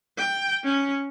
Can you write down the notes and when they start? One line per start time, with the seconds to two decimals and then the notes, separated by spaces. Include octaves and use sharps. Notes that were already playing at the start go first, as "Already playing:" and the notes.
0.18 G5
0.64 C#4